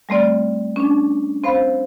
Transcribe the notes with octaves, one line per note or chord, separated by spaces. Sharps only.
G3 A3 C4 D5
C#4 D4
C4 C5 F5 B5